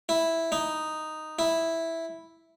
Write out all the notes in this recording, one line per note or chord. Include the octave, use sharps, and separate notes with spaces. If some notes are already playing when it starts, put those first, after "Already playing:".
E4
D#4
E4